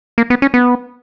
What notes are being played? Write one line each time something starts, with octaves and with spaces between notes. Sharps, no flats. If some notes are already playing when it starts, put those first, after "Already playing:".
A#3
B3
C#4
B3